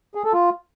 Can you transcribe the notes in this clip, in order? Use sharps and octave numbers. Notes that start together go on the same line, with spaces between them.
G#4
A4
F4